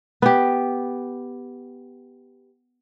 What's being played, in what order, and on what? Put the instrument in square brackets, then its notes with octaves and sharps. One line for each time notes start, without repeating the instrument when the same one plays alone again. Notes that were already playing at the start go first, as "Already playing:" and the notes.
[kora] B3 G4